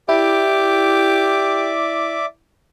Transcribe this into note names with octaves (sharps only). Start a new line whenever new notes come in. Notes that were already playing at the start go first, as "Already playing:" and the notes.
E4 G4 D5 E5 D6